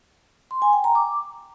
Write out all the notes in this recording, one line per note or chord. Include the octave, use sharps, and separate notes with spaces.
C6
G#5
G5
A#5
D6